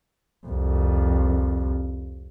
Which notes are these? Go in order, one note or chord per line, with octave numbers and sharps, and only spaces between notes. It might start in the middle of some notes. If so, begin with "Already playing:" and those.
C2 F2